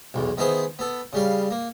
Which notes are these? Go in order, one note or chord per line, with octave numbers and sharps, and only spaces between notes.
B1 E2
D#3 B3 E4 G#4 C5
B3 A4
C#3 G3 F5
A#3